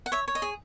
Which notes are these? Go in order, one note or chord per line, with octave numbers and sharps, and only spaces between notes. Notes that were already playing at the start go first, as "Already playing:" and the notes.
F#5
C#5 E5
C#5
D#5
G#4